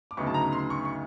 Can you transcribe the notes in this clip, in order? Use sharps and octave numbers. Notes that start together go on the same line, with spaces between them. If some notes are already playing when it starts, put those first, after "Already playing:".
D6
D2 C#3 F#3 B3 D#4 C#6
A5
A#5
C6
C#6
C#6